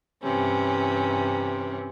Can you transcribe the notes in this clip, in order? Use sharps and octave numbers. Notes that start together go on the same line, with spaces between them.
G2 C3 E3 C#4